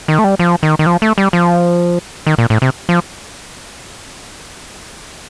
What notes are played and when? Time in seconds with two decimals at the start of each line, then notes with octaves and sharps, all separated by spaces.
0.08 D#3
0.19 A3
0.24 G3
0.39 F3
0.63 D#3
0.79 D#3
0.86 F3
1.02 A3
1.18 G3
1.33 F3
2.27 D#3
2.38 A#2
2.50 A2
2.62 C3
2.89 F3